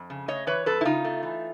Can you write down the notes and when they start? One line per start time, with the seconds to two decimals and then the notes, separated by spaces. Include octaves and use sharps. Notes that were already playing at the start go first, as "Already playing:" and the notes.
Already playing: F2
0.10 C#3
0.28 A3 C#5 D#5
0.47 E3 B4 C#5
0.66 F2 A4 B4
0.81 E4
0.85 C#3 D#4 F4
1.05 A3
1.23 E3